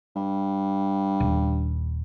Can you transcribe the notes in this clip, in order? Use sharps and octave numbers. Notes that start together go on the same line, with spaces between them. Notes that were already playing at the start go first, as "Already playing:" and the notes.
G2
D#1